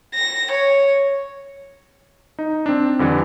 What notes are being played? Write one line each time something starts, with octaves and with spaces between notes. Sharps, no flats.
A#6
C#5
D#4
C4 D4
F2 D3 E3 G3